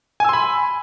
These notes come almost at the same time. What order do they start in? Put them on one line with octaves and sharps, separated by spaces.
G#5 E6 C6 B5